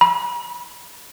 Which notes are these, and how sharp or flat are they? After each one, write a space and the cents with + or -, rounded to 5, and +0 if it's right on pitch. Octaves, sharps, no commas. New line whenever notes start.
B5 -40